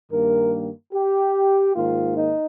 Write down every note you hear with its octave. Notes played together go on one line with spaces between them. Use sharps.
G2 D#3 A#3 A#4
G4
G#2 D#3 A#3 F4
D#4